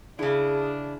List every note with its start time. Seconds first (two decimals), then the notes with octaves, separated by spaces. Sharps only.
0.19 C#3 D4 E4 G#4